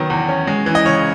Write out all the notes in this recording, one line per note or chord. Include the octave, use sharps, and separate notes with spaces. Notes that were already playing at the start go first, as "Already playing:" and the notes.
Already playing: D#3 F#3 B3
E2
C#4
G#3
E3
D#5
C#3 C#5